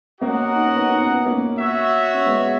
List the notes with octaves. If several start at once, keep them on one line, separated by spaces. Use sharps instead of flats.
A#3 C#4 F#4 A#4 D#5 F#5
D#4
C#4
B3 D#4
D#4
C#4
B3
A#3 C#4
F#4 C#5 E5
C#4
G#3 B3